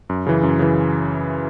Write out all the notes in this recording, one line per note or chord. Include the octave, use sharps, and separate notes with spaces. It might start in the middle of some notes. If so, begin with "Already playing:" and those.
F#2
C#3 E3
F#2
C#3 E3